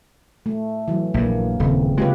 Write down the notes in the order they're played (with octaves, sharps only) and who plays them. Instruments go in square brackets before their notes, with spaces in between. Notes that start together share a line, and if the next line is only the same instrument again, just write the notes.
[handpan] A3
E3 F#3
[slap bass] A#1 G2 [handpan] A#3
[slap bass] D#1 [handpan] C#3 C4
[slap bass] C#3 G#3 [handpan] F4 G4 B4